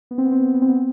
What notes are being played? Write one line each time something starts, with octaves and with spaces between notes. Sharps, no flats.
B3
C4
B3
C4
B3
C4
B3
C4
B3